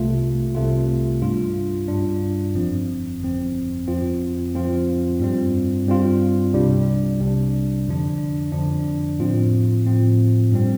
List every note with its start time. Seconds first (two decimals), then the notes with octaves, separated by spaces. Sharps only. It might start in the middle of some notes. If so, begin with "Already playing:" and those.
Already playing: C2 C3 A3 F4
0.55 C2 C3 A3 F4
1.21 G2 G3 D4 F4
1.88 G2 G3 D4 F4
2.55 G1 F2 F3 C4
3.20 G1 F2 F3 C4
3.88 F2 F3 C4 F4
4.54 F2 F3 C4 F4
5.20 G2 G3 C4 F4
5.87 G2 G3 C4 F4
6.53 C2 C3 G3 D4
7.20 C2 C3 G3 D4
7.87 F2 D3 F3 D4
8.52 F2 D3 F3 D4
9.19 A2 F3 C4 F4
9.85 A2 F3 C4 F4
10.52 G2 G3 C4